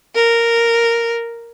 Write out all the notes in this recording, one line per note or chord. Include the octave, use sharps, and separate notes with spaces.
A#4